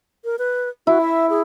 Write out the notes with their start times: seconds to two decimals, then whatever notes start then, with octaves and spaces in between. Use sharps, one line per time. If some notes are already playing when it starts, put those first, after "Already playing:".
0.25 A#4
0.39 B4
0.87 E4 F#4
1.01 E5
1.30 G#4